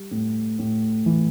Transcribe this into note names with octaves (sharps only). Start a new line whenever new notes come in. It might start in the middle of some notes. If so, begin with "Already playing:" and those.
Already playing: G3
A2
A2
E3